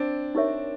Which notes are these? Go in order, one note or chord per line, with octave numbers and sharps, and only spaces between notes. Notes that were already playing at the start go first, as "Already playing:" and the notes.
Already playing: C4 D4
D#4 G4 A#4 C#5 E5